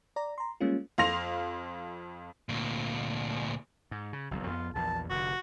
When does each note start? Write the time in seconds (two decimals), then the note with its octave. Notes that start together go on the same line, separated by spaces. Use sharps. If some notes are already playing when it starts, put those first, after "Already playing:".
0.16 D5 A#5
0.38 A#5 C6
0.61 G3 G#3 A#3 C#4 F4
0.98 F2 F5 C6 A#6 F7
2.49 D2 A#2
3.91 G#2
4.13 C#3
4.31 F#1 B1 F2
4.47 F2 A#3 B3 F4
4.75 A#1 E2 A5
5.10 F1 D3 F#4